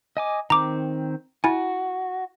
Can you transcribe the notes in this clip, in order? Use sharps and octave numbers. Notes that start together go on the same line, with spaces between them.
D#5 G#5 D6
D#3 C4 A#5 D6
E4 F#4 G#5